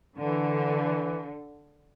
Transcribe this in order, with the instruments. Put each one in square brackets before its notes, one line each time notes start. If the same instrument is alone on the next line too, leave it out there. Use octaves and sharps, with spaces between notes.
[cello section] D3 [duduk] E3